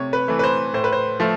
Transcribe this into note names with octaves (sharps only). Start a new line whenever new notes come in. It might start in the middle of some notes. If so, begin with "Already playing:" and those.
Already playing: C3 A3 C#5
B4
E3 A3
B4
C5
A2 C5
B4
C5
F3 A3